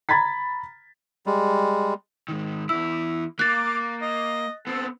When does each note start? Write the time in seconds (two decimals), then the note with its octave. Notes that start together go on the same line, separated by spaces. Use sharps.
0.09 A#5 B5 G#6 A6 B6
1.26 G3 G#3
2.28 G#2 D#3
2.69 E2 E4 E6
3.39 A#3 D6 F#6 A6
4.02 D#5
4.67 B3 C4 A4